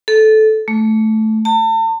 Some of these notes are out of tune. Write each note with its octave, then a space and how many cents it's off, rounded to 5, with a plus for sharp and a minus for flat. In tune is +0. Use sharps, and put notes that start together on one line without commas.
A4 -15
A3 -10
A5 +40